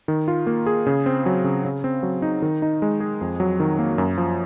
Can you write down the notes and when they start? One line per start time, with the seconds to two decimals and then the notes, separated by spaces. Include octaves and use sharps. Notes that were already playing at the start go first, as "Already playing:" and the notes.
0.08 D#3
0.28 F4
0.47 A#3
0.66 G#4
0.86 C#3
1.06 C4
1.26 F#3
1.44 C#3
1.65 C#3
1.84 C4
2.03 F#3
2.22 D#4
2.42 D#3
2.62 D#4
2.82 G#3
3.00 G#4
3.21 F2
3.40 F#3
3.60 D#3
3.79 A#3
3.98 F#2
4.18 F3